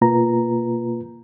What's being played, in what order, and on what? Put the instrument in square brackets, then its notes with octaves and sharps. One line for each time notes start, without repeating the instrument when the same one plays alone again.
[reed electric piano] B2 A#3 F4 B4 A#5